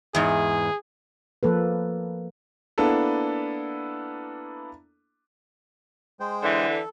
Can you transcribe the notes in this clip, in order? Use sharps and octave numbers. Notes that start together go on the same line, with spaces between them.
E2 G#2 G#4
F3 A#3 A4 B4
A#3 B3 D4 E4 A4
G#3 C5 G5
D3 E3
A4